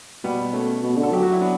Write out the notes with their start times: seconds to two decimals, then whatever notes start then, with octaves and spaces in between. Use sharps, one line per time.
0.24 B2 G3 B3
0.53 A3 C#4
0.83 B2
0.97 D3
1.03 A4
1.11 F#3 G4
1.23 F#4
1.32 E4
1.40 B3 D4